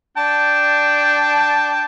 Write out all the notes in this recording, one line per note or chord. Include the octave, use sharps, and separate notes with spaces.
D4 G5 A5